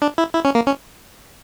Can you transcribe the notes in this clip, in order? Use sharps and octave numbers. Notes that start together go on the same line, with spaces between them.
D4
E4
E4
C#4
A#3
C#4